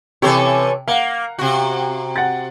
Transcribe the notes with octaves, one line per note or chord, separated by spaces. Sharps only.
C3 E3 A4 C#5
A#3 F5 F#5
C3 F#4
F#5 A6